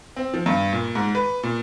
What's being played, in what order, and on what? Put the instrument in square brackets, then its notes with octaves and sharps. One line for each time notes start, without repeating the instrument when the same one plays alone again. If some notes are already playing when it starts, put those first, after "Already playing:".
[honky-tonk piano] C4
F3
G2
A#2
G#2
B4
A#2